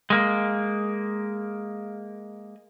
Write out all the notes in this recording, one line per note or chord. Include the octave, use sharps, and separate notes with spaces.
G#3 A#3